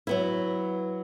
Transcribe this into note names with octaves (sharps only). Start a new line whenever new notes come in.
F#3 B3 E4